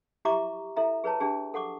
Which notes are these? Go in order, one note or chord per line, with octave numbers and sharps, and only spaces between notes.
E4 G4 E5 A#5 C#6 D6
E4 A4 E5 A#5
G#4 B4 C#5 A5 A#5
D4 G4 G#4 A5
A4 F#5 C#6 D6